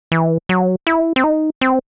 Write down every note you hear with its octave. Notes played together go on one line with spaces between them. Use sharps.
E3
F#3
E4
C4
D#4
C4